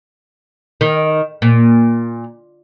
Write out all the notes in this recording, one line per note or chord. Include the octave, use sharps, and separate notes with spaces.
D#3
A#2